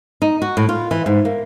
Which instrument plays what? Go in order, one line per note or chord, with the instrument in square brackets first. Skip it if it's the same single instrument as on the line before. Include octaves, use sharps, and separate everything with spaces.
[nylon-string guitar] D#4
F#4
A2
F4
E3
G#2
A#3